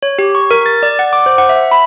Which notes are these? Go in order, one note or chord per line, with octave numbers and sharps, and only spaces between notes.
C#5
G4
C#6
A#4
A6
D5
F#5
D6
C5
F#5
E5
B5